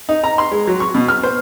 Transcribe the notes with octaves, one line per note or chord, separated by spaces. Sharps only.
D#4
A#5
C6
G#3
F#3
C#6
B2
F6
C5